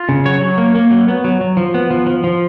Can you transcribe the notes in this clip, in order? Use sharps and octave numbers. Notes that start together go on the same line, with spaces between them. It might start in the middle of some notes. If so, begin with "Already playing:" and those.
Already playing: F4
C#3
F#3 C#5
F#3
A#3
A#3
F#3
B3
F#3
F#3
F3
B3
F3
F3
F3